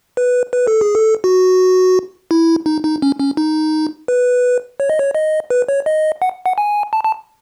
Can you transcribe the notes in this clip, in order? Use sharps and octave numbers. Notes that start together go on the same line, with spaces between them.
B4
B4
A4
G#4
A4
F#4
E4
D#4
D#4
C#4
C#4
D#4
B4
C#5
D#5
C#5
D#5
B4
C#5
D#5
F#5
F#5
G#5
A5
A5